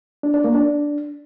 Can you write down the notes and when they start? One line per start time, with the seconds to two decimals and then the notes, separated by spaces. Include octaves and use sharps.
0.23 D4
0.34 D4
0.44 A#3
0.55 D4